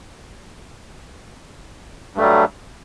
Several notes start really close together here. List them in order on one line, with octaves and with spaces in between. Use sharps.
G2 A3 G3 F#3